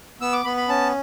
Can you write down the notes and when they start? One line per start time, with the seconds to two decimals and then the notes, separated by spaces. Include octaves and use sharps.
0.21 B3 E6
0.33 D6
0.44 B3 B5
0.57 B5
0.68 C#4 A5